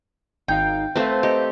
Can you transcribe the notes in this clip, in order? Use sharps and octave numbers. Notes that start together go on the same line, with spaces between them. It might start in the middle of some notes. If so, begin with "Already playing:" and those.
G#1 D#4 F5 G5
A3 C4 B4 C5 F5
D#4 G4